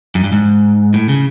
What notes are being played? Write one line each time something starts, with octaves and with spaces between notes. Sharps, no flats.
F#2
G2
G#2
A2
C#3